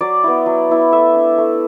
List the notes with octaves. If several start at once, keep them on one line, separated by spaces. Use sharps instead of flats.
F#3 D5
B3 E4
F#3
B3 E4
A3 E5
D4
A3